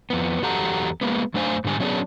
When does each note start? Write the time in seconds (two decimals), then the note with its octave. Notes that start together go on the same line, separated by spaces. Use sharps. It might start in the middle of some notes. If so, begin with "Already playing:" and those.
0.10 F2 B3
0.42 E2 F#3 G4 A4 F#5 A#5
1.01 G#3 A#3 B3
1.34 F#2 A3 D4 C5 F5 G#5
1.64 G#2 D3 G3 G#5
1.80 F#3 B3 C#4 D4 G#4